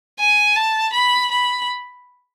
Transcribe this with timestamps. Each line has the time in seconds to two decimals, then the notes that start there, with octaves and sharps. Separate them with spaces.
0.19 G#5
0.56 A5
0.93 B5
1.31 B5